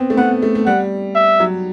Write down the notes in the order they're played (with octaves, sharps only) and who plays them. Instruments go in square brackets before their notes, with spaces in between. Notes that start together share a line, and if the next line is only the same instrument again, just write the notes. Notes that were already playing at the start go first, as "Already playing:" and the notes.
Already playing: [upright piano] B3 C4
A3
[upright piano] B3 [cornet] F#5
[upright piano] A3
A3
[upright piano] G3 [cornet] F#5
[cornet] E5
[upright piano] F#3